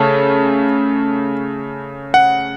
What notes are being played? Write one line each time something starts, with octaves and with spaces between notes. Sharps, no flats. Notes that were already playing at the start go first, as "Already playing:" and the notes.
Already playing: C#3 A3 C#4 A5
F#5